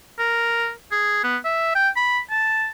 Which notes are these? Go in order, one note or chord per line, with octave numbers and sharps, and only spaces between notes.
A#4
G#4
B3
E5
G5
B5
A5